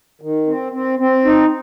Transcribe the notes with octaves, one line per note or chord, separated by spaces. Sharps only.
D#3
C4
C4
C4
D#4